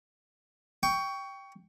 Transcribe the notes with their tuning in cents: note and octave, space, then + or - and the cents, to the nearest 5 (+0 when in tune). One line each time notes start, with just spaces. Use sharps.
G5 +0 C#6 +20